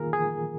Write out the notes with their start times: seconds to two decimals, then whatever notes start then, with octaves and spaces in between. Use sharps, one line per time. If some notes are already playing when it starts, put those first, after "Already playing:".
Already playing: D#3 A#3 F4 G#4 A#4
0.13 G#4